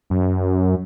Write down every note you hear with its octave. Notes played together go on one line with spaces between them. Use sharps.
F#2